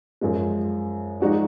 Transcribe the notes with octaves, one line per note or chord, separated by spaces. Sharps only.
F#2 F3 G#3
F3 G#3 D#4 F#4 D5